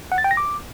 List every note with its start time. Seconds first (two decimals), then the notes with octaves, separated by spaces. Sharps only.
0.12 F#5
0.18 A6
0.24 G5
0.31 A#6
0.37 D6